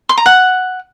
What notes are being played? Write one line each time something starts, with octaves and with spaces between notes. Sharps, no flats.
C6
A#5
F#5